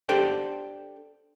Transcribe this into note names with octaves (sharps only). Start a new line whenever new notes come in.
D4 G4 A4 C5 D5 G5